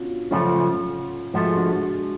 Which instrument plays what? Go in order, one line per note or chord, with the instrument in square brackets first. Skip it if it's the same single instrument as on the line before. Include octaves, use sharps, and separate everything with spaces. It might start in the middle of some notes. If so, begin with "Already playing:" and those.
Already playing: [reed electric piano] B3 C#4 D4 F4 F#4
[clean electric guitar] F#2 C#3 F3 A3 [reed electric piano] C#4 F4
[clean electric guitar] G#2 F3 A3 [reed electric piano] F#4
[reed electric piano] G#4
D4 F#4